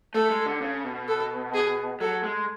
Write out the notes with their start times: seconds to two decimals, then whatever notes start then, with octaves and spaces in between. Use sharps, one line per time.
0.14 A3 A4
0.30 G#3
0.46 D3
0.61 C#3
0.85 B2
1.08 A4
1.54 G#4
2.01 F#3 A4
2.24 G#3